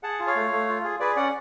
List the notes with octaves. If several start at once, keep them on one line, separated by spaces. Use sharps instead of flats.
G#4 F#5 A5
F4
C#5 F5
A3
A3
F4
G#4
G#4 B4 D5
C#4 D5 F#5